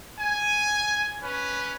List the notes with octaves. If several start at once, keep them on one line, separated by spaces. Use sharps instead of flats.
G#5
C#4 B4